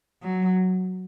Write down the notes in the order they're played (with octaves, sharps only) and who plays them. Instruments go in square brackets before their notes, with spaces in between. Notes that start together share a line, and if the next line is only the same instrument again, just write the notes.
[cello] F#3